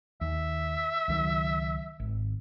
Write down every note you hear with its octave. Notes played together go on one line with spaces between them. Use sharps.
D#2 E5
C#2 D#3 F#3
G#1